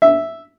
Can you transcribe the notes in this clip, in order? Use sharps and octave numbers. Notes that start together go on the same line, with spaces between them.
E5